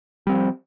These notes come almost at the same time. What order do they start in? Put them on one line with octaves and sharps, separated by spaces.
G3 C4 F3